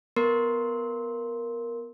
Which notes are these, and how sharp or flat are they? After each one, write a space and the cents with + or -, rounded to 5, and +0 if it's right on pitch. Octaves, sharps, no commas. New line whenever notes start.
B3 +0 A#4 +0 C6 +0